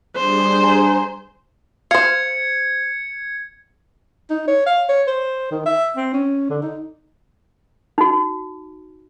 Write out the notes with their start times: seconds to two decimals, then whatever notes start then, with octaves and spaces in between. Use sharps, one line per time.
0.17 G3 D4 G#4 C5
0.62 G#5 A#5 C6
1.91 C5 F5 G#6 C#7
4.31 D#4
4.48 C#5
4.67 F5
4.89 C#5
5.08 C5
5.51 D#3
5.66 E5
5.97 C4
6.14 C#4
6.50 D3
6.63 D#4
7.98 D#4 F#4